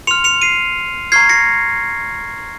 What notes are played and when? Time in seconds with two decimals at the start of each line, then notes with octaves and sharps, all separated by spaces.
0.07 C6 F6 C#7 F7
0.24 C#7 F7
0.42 C7 D#7
1.12 A#5 C#6 F6 G#6 C7
1.29 A#6 C#7